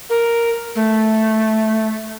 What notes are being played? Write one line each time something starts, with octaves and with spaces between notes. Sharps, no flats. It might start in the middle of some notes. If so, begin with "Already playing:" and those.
A#4
A3